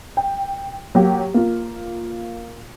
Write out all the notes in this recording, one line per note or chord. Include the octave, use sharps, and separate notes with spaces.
G5
F#3 A#3 G4
A#3 F4